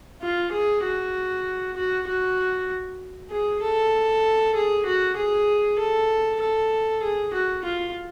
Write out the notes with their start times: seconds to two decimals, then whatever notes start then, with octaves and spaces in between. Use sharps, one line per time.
0.22 F4
0.52 G#4
0.84 F#4
1.77 F#4
2.07 F#4
3.30 G#4
3.62 A4
4.55 G#4
4.86 F#4
5.17 G#4
5.79 A4
6.40 A4
7.02 G#4
7.34 F#4
7.65 F4